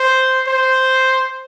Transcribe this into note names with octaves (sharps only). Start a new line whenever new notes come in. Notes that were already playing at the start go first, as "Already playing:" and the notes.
Already playing: C5
C5